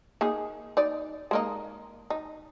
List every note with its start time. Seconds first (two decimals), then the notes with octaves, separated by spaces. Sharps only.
0.21 A#3 D#4 G#4
0.77 D#4 D5
1.31 G#3 A#3 D#4
2.10 D#4